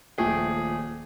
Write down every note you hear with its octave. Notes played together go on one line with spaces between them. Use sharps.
D#1 F3 A3 G#4 G5